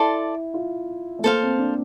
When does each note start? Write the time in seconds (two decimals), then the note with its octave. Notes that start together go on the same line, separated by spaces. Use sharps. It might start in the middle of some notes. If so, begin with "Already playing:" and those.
Already playing: E4 A4 D5 A5 C6
0.54 F4
1.19 A3
1.24 A#3 A4 C5 F5
1.42 C4
1.59 D4